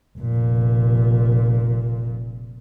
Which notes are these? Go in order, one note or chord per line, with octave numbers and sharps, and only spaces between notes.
F1 A#2